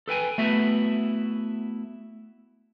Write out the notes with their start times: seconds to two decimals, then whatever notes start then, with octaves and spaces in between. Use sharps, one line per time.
0.08 A4 B4 G5 G#5
0.38 A3 B3 E4 F#4 B4 E5